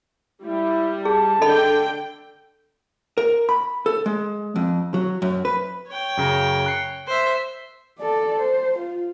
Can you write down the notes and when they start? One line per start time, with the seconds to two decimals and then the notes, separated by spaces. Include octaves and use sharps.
0.44 G3 E4
1.05 G#4 A5
1.42 D3 A4 D#5 G5 B5
3.18 A#4
3.49 B5
3.86 A4
4.06 G#3
4.56 F2
4.94 F#3
5.22 F#2
5.45 B4
5.88 C#5 G5
6.17 F#2 C#3 A#5
6.66 F#6 C7 C#7
7.07 C5 E5
7.99 A4 D5
8.39 C5
8.78 F4